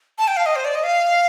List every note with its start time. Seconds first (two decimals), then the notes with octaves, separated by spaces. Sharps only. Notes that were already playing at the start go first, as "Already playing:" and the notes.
0.18 A5
0.28 G5
0.37 F5
0.46 D#5
0.56 C5
0.65 D5
0.75 D#5
0.84 F5